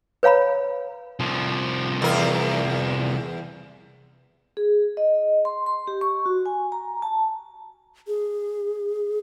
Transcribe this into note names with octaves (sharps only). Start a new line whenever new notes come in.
B4 C#5 F5 A#5 B5
C2 F3
E2 A#4
G#4
D#5
C6
C6
G4
C#6
F#4
G#5
A#5
A5
G#4